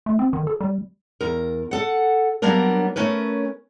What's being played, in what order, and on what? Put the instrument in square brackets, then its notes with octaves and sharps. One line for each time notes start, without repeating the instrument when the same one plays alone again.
[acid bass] A3
C4
D#3
A4
G3
[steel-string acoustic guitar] E2 A#4
A4 F#5
F#3 G3 A#3 B3 D4 A#4
A3 C#4 A#4 B4